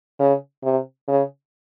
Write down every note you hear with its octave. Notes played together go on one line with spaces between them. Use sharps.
C#3
C3
C#3